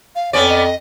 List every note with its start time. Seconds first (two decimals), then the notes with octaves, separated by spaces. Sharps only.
0.15 F5
0.33 F2 B3 C#4 C#5 D5
0.48 D#5